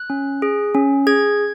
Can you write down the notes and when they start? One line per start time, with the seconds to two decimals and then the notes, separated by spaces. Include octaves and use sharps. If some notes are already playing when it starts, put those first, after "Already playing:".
Already playing: F#6
0.10 C#4
0.42 G#4
0.75 C#4
1.07 G#4 G#6